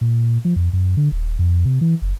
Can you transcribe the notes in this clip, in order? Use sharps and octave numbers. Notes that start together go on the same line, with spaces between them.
A#2
F3
F2
F#2
D3
D#1
F2
C3
E3
F#1